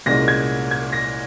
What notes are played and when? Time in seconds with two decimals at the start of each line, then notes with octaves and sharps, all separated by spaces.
0.06 C2 A#2 G#3 C#4 A#6
0.28 G#6
0.71 G#6
0.93 A#6